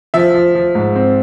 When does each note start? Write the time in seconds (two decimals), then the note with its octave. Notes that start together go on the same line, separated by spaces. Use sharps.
0.14 F3 E5
0.34 F3
0.55 F3
0.75 G#2
0.96 C4